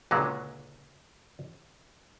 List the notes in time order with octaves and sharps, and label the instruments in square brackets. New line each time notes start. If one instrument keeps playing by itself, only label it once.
[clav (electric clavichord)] C#2 A#2 D3 F#3 G#3